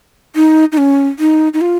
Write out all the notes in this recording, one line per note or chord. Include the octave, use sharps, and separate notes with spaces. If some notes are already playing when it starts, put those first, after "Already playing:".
D#4
D#4
C#4
D#4
D#4
F4